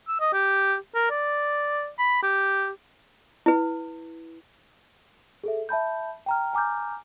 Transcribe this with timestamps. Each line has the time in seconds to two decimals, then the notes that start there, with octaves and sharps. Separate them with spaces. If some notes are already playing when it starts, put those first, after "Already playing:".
0.08 E6
0.20 D#5
0.33 G4
0.95 A#4
1.11 D5
1.99 B5
2.23 G4
3.46 E4 B4
5.44 G#4 A4 E5
5.69 E5 A5 B5 G6
6.26 G5 A#5 F6
6.53 G#5 A#5 D6 F6 G6